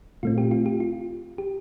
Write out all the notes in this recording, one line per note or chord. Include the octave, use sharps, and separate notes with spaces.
A#2 A3 C4 F4
G4
F4
G4
F4
G4